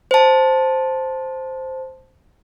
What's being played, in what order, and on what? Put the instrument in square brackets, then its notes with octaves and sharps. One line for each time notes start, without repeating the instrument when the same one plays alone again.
[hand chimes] C5 A5